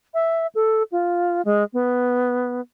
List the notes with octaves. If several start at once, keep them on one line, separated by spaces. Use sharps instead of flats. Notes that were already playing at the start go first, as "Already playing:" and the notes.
E5
A4
F4
G#3
B3